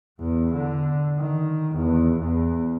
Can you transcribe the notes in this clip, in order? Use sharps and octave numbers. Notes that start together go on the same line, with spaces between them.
E2
D3
D#3
E2
E2